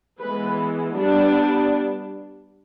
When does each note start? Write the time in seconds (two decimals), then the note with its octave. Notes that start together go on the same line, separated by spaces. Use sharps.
0.20 E3 G#3 B3 B4
0.96 G3 B3 D4